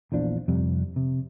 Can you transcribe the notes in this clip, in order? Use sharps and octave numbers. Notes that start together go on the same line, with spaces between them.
A#1 E2 F3 D4
F2 C3 G3
C3